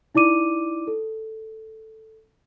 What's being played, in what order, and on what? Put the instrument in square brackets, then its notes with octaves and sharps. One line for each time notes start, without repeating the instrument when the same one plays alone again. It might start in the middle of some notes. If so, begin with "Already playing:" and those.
[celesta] D#4 E4 D5 D6 D#7
A4